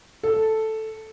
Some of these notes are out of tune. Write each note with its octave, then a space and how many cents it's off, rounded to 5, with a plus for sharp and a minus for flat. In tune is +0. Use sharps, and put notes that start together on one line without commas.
A4 +0